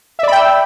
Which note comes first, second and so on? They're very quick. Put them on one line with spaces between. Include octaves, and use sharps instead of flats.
E5 D5 B5 G5 E6